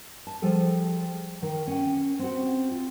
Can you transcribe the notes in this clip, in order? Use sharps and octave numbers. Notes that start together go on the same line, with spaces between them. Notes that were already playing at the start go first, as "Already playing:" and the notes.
A5
F3 G3 G#4 A4
D#3
C#4 G5
C4 F#4
F4